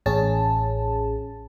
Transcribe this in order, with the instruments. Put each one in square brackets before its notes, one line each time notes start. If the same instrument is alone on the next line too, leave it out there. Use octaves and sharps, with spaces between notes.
[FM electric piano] A1 C#4 G#4 A5